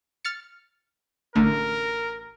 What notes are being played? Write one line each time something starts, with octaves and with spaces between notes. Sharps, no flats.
F6 A6 C#7
A1 D3 A3 A#4